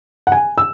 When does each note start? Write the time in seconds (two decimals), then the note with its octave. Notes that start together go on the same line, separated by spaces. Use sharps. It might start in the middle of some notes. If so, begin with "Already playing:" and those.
0.27 F#5
0.32 G#5
0.58 E6